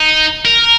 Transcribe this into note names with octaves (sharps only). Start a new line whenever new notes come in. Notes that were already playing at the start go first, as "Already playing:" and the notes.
Already playing: D#4
A#4